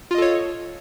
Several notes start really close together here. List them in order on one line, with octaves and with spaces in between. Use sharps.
F4 D#5 A4 C#5